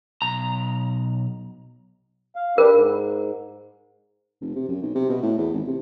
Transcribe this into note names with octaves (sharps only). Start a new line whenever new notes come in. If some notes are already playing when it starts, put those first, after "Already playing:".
B1 A#5
F5
D4 G4 A#4 B4
G#2
F1
C3
F#2
B1
C3
B2
A2
E2
G#1
C3